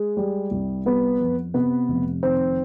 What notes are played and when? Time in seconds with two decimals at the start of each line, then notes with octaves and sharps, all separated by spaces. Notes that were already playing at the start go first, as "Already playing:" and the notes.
Already playing: G#3 G#4
0.17 G3
0.51 C2
0.85 G3 B3 B4
1.20 F2
1.54 C3 B3 B4
1.89 F1
2.23 D#3 C4 C5